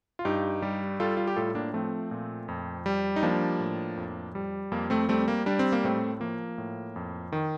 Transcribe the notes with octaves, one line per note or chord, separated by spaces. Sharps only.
F4
G2 D#4 G4
G3
G3 F4 A4
F4
G4
A2 F4 A4
A#3 D4
F3 A3 C4
A#2
F2
G3
D#4
F3 A#3 D4
A2
F2
G3
F2 A#3
A3 C4
G3 A3 C4
A#3
G3 D4
C4
A#3
A2 A3 C4
F3 A#3
A2
F2
D#3